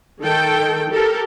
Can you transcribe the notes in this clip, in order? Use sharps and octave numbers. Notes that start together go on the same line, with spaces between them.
D#3 A4 G5
G4 A4 A#4